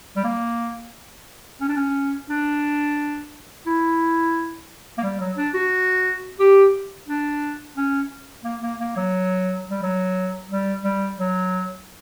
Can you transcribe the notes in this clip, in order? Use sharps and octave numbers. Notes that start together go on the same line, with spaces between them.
G3
A#3
C#4
D4
C#4
D4
E4
A#3
G3
F#3
D4
F#4
G4
D4
C#4
A#3
A#3
A#3
F#3
G3
F#3
G3
G3
F#3